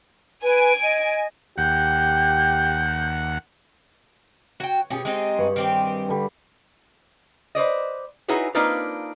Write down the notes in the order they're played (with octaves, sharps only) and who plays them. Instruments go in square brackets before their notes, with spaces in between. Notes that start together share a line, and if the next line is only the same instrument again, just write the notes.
[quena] B4 [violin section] G#5 D7
[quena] D#5
[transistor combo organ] D#2 F#5 [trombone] G4 [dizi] G6
[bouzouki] F#4 G5 [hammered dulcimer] C#5
[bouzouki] B2 C#4 [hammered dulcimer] G4 G#4
[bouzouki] G#3 C4 D#4
[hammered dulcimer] G2 C#5 B5
[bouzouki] D#3 C4 G4
[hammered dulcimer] D3 G3
[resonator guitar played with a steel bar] B4 C5 D5 D#5
D#4 E4 F#4 G#4 B4 C#5
A#3 C4 D4 D#4 F4 B4